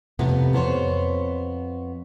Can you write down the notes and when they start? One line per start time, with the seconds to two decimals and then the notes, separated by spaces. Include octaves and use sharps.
0.19 F2 A2 C3 B3
0.53 F2 B3 C5 C#5